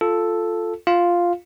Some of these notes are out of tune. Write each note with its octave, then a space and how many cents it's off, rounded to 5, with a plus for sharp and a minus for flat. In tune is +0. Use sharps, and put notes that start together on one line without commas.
F4 +0 A4 +0
F4 +0 F5 +0